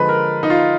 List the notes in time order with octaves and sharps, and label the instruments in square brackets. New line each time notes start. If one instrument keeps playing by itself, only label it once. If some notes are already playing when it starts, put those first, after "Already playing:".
Already playing: [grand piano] D3 F3 G#3 B4
A#4
D#4
F4